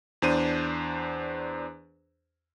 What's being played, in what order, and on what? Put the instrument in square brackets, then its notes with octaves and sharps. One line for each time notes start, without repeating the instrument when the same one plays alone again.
[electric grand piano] E2 D4 C5 D#7